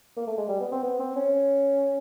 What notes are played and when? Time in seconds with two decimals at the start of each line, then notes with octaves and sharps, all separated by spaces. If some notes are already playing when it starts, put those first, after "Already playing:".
0.17 A#3
0.27 A3
0.38 G#3
0.49 G3
0.60 B3
0.72 C4
0.83 B3
1.00 C4
1.16 C#4